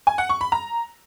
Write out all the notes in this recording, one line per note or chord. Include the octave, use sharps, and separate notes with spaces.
G#5
F#5
C#6
B5
A#5